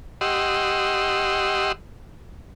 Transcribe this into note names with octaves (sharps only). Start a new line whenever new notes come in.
G4 D#5 F#5 C6 E6